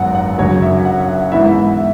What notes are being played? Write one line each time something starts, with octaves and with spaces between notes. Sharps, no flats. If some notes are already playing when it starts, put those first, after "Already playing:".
Already playing: G#1 F#2 F#3 B3 F#5
F#5
F#2 C#3 F#3 C#4 C#5
E5
F#5
F#5
G#2 E3 B3 E4 E5